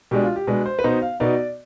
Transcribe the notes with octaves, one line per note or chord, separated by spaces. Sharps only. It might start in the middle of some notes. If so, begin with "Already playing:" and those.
B2 G#3 D4 G4
F4
G4
B2 G#3 D4 B4
C5
B4
B2 B3 D#4 C5
F5
B2 B3 D#4 D5